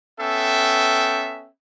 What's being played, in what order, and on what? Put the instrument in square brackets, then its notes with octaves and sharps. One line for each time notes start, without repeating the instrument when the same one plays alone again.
[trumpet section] B3 C#4 A4 E5 G5